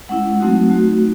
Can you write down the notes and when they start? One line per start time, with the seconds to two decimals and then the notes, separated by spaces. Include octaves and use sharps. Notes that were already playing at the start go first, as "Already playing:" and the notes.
0.09 G#3 C#4 E4 F#5
0.40 F#3 A3 C4 D#4 F#4
0.70 A3 D#4 F#4